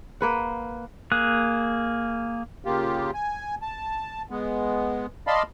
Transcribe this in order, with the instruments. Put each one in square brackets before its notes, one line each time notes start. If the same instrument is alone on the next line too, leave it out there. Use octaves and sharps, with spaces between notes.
[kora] A#3 B4 F#5
[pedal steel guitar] A#3 G#4 F#6
[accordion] C#3 A#3 F4 G4
G#5
A5
G#3 B3
D5 D#5 F5 A5 B5 C6